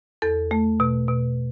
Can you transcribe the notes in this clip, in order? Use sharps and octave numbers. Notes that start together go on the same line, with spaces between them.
E2 A4
A3
B2
B2